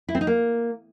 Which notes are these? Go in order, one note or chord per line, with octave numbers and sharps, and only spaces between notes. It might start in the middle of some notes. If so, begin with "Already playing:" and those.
E4
C4
D#4
A#3